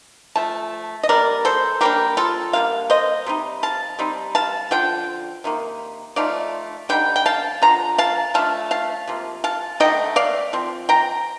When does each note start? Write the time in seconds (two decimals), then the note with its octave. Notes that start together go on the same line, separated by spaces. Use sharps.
0.36 F3 A3 A5
1.03 D#5
1.09 D3 G3 A#3 A#4 D5
1.45 A4 C5
1.81 G3 A#3 D4 G4 A#4
2.17 F4 A4
2.53 D3 G3 A#3 F5
2.90 C5 D#5
3.26 C3 G3 D#4
3.63 F5 A5
3.99 G3 C4 D#4
4.35 F5 A5
4.71 D3 F3 G5
5.44 C3 D#3 A#3
6.16 F3 A3 D#4 D5 F5
6.89 D3 G3 D#4 G5
7.16 G5
7.26 F5 A5
7.62 D3 F3 A#5
7.98 F5 A5
8.34 F3 A3 D4 F5 A5
8.71 F5 A5
9.07 C3 F3 A#3
9.44 F5 A5
9.80 D3 A3 D#4 D#5 G5
10.16 D5 F5
10.53 F3 C4
10.89 G5 A#5